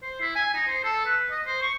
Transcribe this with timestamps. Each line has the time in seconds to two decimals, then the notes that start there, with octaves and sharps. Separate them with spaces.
0.02 C5
0.21 E4
0.35 G#5
0.54 D#4
0.67 C5
0.84 A4
1.05 B4
1.31 D#5
1.46 C5
1.62 C#6